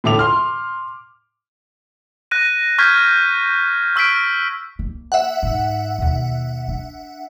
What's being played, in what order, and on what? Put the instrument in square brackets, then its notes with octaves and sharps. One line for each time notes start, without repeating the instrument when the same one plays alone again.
[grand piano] A2 D3 A4 E5 D6 F7
C6 F6
[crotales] F#6 A#6 D#7
C#6 F6 G6 G#6 B6
C#6 E6 F6 B6 D7
[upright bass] A#3
[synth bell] E5 F#5
[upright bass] G#2
D#2 B2
D4